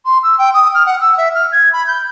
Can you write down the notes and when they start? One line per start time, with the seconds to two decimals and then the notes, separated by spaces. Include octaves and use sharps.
0.06 C6
0.23 E6
0.39 G5
0.54 D#6
0.74 F6
0.86 F#5
1.01 E6
1.18 E5
1.35 F6
1.52 G#6
1.73 B5
1.87 G6